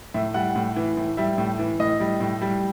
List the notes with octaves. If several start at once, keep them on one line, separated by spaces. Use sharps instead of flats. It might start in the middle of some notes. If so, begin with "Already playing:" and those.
A2 E5
G3 F#5
A2
E3
A2
G3 E5
A2
E3
A2 D#5
G3
A2
G3